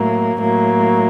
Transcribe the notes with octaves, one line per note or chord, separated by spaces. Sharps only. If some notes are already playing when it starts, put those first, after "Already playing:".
Already playing: A2 F#3 A#3
A2 F#3 A#3